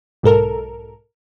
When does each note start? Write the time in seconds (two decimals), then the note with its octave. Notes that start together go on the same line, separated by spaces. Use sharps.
0.23 B1 G#2 A4 A#4